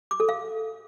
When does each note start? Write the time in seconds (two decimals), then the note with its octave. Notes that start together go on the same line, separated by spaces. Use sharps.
0.11 D6
0.20 A4
0.29 F5